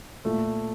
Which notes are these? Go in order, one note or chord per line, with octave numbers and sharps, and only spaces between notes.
A#2 A3